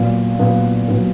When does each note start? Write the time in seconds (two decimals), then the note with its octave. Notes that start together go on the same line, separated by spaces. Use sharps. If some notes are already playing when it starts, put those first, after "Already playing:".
Already playing: A#2 F#3 B3
0.39 A#2 F#3 B3
0.88 A#2 F#3 B3